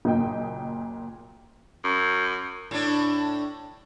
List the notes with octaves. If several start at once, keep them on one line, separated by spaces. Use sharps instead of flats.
F#1 A#2 D#5 G5
F#2
A2 D4